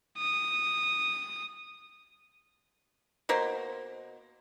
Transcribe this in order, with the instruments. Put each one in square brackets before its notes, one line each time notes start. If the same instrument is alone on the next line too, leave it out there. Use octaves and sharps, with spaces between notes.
[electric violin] D#6
[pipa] B2 A#3 C5